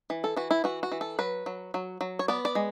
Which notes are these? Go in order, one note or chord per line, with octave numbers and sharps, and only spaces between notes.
E3
A4
E3 F#4
E4
E3 F#4
F#4
E3
A4
F#3 B4
F#3
F#3
F#3
C#5
B3 D5
D5
G#3